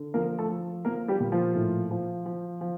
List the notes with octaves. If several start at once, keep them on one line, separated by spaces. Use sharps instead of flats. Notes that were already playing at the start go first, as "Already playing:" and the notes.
Already playing: D3
F3 A#3 A#4
A3 A4
F3
F3 A#3 A#4
G3 G4
A#2
F3 F4
A2
F3
F3
F3